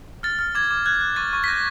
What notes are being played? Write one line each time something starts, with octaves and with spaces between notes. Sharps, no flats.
F6 A6
F6
D6 G#6
D6
F#6 G#6
F#6
C#6 A6
C#6
B6
G6 A#6